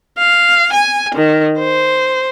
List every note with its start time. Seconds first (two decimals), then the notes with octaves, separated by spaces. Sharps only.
0.18 F5
0.73 G#5
1.15 D#3
1.58 C5